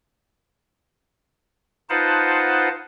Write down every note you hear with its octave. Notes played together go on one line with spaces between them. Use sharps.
D#4 F4 B4 C5 F#5 A5